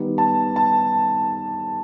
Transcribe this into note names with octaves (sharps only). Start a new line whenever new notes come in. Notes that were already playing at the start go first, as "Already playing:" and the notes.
Already playing: D#3 G3 B3 D#4
A5
A5